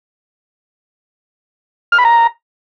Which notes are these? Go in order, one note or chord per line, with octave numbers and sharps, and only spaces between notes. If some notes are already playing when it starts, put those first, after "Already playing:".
F6
B5
A#5